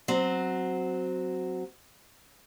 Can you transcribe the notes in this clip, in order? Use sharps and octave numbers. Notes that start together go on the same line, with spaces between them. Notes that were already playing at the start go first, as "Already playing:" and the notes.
F#3 C4